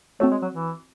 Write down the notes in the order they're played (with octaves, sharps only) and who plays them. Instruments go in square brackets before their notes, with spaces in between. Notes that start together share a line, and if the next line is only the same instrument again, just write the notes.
[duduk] A3 [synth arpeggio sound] C4 F#4 C#5
[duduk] G#3
F#3
E3